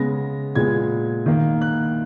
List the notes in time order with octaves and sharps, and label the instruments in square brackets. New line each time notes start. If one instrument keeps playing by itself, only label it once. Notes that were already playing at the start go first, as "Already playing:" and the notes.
Already playing: [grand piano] C#3 G#3 B3 A#6
A#2 G#3 B3 G#6
D#3 A#3
F#6